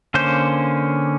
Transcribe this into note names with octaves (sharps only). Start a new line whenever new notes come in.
D3 A#3 C#4 C5 G6